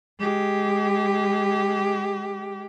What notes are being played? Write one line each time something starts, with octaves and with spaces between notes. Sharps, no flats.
G#3 G4